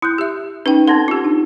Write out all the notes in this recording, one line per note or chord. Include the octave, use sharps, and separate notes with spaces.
E4 D#6 F#6 G6
G4 E5
C#4 D#4 B4 G5
C4 C#4 A4 F#5 C6 G#6
F4 G4
D4 D#4